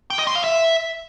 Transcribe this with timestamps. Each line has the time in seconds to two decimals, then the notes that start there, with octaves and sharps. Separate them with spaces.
0.10 G5
0.19 D#5
0.27 C6
0.35 F5
0.44 E5